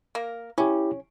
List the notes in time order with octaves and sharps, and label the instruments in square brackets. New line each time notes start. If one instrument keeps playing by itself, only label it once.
[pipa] A#3 A#4
[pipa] C#4 [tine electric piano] E4 G4